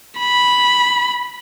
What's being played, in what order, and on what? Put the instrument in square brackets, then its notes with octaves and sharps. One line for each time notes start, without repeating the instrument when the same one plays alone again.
[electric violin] B5